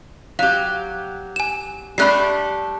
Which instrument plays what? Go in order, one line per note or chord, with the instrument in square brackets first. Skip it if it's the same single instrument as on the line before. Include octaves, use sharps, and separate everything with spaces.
[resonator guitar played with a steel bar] F#3 G4 [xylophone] F5
[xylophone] G#5 E7
[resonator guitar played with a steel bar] G3 A3 D4 [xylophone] B5 F#6 C7